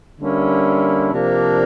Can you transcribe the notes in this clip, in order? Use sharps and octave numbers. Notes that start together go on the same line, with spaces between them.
D3 G3 A#3 C#4 E4
C3 F3 A#3 D4